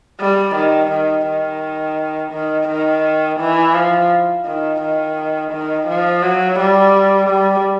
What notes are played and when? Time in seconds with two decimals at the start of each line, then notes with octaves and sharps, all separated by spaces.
0.21 G3
0.55 D#3
0.91 D#3
1.27 D#3
2.33 D#3
2.68 D#3
3.40 E3
3.75 F3
4.46 D#3
4.81 D#3
5.52 D#3
5.88 F3
6.22 F#3
6.59 G3
7.29 G3